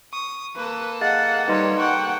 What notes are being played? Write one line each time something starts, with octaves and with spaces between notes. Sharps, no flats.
C#6 D#6
A#3 A4 B4
G#4 D#5 F5 F#5 A6
G3 D#4 B4 C#5 D#5 C6
F#5 G5 C#6